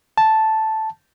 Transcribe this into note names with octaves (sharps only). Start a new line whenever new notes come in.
A5